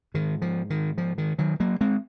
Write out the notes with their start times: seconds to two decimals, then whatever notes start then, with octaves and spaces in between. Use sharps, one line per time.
0.14 G#2 D#3
0.42 F3
0.70 D#3
0.98 F3
1.18 D#3
1.38 D#3 F#3
1.60 F#3 A#3
1.81 G#3 C4